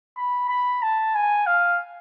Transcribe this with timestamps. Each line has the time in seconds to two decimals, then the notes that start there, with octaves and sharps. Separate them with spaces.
0.17 B5
0.49 B5
0.82 A5
1.15 G#5
1.46 F5